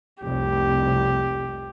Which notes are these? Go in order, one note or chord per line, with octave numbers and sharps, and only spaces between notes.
F1 C2 G4